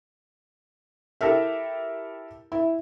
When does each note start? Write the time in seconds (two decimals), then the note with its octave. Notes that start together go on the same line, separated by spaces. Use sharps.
1.21 E4 G4 A4 A#4 E5
2.52 E4